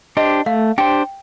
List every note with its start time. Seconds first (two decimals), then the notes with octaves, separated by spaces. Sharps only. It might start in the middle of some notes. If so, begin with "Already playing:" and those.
0.17 D4 G4 C5 D#5
0.46 A3 F5
0.78 D4 G4 C5 G5